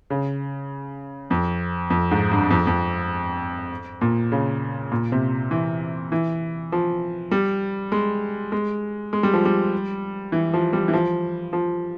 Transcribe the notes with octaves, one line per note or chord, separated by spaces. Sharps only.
C#3
F2
F2
G#2
G2
F2
F2
A#2
C#3
A#2
C3
E3
E3
F3
G3
G#3
G#3
G#3
G3
F3
G3
E3
F3
G3
E3
F3
F3